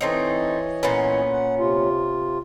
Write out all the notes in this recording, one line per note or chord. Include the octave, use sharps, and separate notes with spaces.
E3 A3 C4 D#4 C#5 D#5
A#2 B3 C#4
F#5
C3 F4